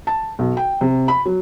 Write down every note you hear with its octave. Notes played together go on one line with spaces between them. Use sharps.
A5
B1
G5
C3
B5
F#3